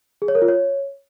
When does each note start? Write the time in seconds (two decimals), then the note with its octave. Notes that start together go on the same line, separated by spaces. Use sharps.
0.22 G#4
0.28 C#5
0.35 A#4
0.42 F4
0.48 C#5